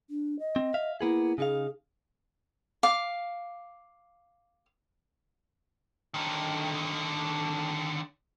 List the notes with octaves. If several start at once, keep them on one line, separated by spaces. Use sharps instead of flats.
D4
D#5
C4
E5 F5
A#3 B3 E4 G#4
C#3 D#4 G#4 F5
F5 D6
D3 D#3